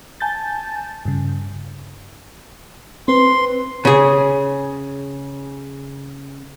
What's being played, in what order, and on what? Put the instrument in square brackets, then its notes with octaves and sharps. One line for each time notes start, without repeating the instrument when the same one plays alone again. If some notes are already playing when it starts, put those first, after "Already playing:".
[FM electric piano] G#5 A5 G6 A6
G2 C#3
[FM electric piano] C4 B4 [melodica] C6
[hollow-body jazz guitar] C#3 G#4